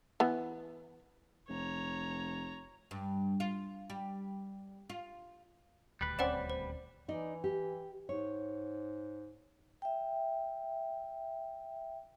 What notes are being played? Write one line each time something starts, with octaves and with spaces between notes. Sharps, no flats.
E3 B3
F1 C#5 A#5
G2
F4
G3
F4
D#1 D2 G3 B4
C4 C#4 C5 D5 F#5 E7
C5
E3 D#4 D5
G4
G#2 C#5
E5 G5